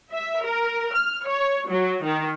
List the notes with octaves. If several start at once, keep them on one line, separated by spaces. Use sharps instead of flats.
E5
A#4
F6
C#5
F#3
D#3